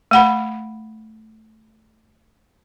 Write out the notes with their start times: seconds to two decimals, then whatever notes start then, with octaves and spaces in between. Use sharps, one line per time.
0.11 A3 F#5 B5